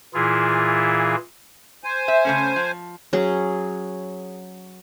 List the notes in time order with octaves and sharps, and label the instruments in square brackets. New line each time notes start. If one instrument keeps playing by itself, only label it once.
[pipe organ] A#2 E3 E4 F4 G#4
[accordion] C5 G#5
[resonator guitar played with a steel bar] E5
C#3 A3 C#4
F3
[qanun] F#3 C#4 G#4